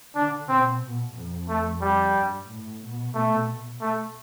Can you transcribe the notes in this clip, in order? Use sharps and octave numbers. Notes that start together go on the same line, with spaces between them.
D3 D4
B2 C4
B2
F2
A3
G3
G2
A2
B2
A3
A3